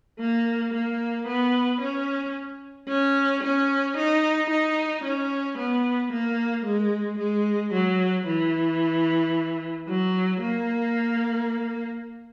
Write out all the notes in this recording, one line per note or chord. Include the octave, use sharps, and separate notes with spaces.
A#3
A#3
B3
C#4
C#4
C#4
D#4
D#4
C#4
B3
A#3
G#3
G#3
F#3
E3
F#3
A#3